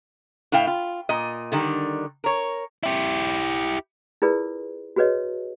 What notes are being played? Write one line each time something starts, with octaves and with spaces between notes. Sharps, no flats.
A2 E4 F5 G5
F4
A#2 D#5
D3 D#3 G3
A#4 C#5
E4 G4
E4 F4 G#4 A#4 B4 D5
F#4 G#4 B4 C#5 D#5